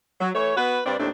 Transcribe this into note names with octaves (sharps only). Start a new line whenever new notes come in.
F#3
E3 A3 C#5
B3 F#4 B4
G2 C4 D4 B4 D5
D#2 A2 C4 D4